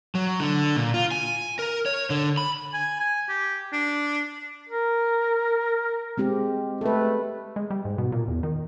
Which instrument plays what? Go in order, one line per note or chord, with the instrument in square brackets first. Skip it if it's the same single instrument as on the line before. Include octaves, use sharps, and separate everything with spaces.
[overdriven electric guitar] F#3
D3
A#2
F4
G#5
A#4
C#5
D3
B5
[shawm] G#5
G#5
G4
D4
[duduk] A#4
[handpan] G#3 C4 G4
[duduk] A3 [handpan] A4 B4
[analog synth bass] G#3
G3
G#2
B2
A#2
E2
D#3